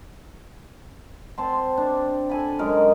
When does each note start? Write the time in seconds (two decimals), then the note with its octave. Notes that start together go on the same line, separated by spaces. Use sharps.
1.38 C4 A5 C6
1.77 D4
2.30 A4 G#5 B5
2.59 F#2 G#3 D#4 A#4